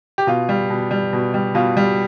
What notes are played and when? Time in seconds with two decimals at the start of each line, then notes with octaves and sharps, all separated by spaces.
0.18 G4
0.27 B2 F4
0.49 G3
0.70 B2
0.91 G3
1.13 B2
1.34 G3
1.55 B2 F4
1.77 G3